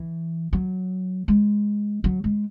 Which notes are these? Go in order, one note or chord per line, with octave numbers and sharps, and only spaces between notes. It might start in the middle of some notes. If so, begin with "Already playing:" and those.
Already playing: E3
F#3
G#3
F#3
G#3